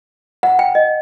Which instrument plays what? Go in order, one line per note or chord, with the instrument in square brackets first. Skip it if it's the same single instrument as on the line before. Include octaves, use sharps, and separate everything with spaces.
[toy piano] F#5
G5
D#5